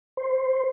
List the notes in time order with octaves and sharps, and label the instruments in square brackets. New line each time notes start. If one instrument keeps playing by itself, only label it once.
[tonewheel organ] C5